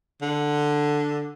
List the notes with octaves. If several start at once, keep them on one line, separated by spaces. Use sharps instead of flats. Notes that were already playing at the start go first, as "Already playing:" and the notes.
D3